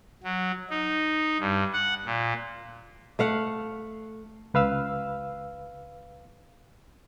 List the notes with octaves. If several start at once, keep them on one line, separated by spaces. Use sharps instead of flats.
F#3
D#4
G2
F#5
A#2
A3 F5 F#5
C#2 B4 F5 E6